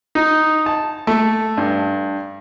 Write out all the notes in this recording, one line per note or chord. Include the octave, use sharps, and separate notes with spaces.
D#4
A5
A3
G2